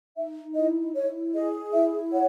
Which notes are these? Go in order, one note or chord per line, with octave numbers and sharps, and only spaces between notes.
D#4 E5
E4 D#5
E4 C#5
G#4 D#5
E4 E5
C#5 F#5